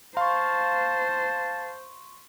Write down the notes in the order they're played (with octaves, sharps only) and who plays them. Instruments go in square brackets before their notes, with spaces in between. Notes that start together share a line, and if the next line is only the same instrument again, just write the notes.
[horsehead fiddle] C5 [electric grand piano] F5 [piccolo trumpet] A5 [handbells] C6 C#6